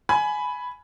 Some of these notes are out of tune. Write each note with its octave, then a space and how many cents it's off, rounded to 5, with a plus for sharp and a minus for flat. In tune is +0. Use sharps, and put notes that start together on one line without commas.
G#5 +15 B5 +0